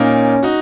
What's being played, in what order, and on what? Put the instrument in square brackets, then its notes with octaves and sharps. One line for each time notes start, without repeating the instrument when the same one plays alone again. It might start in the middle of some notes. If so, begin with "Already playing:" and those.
Already playing: [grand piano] A#2 A#3 D#4 A#4 [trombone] C#4
[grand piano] D#4 F#4